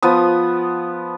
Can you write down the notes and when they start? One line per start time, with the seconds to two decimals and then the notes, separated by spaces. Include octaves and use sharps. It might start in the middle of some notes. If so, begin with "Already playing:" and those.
0.02 F3 B3 D#6